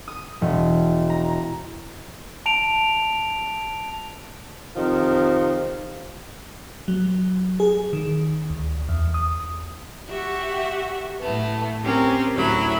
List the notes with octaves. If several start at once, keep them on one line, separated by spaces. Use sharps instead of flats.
D#6
E1
A#5
A5 D7 F7
F2 C3 D#3 F3
F#3
G#4
D#3
D2
E2
D#6
F#4 G4 E5 F#5
A2 A3 B3
C4 C#4 G4 A#4
D2 A2 F#3 E4 B5